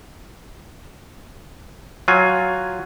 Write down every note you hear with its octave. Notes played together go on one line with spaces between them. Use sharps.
F#3 F4 G#5